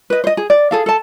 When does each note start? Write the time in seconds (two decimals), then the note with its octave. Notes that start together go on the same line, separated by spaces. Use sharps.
0.10 B4 D#5
0.24 C5 D#5
0.37 G#4
0.50 D5
0.71 G#4 A4 F5
0.86 A4 A5